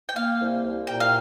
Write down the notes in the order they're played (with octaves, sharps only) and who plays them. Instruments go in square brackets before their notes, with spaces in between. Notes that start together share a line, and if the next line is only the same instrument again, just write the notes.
[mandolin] G5
[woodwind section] A#3 [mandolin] F5
[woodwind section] C2
C2
[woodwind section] A#2 [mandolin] G5
[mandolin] F5